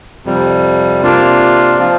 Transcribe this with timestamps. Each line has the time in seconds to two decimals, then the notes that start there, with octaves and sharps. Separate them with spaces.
0.25 F2 C3 G3
1.02 C3 A#3 D4 F4
1.79 F3 C4 F4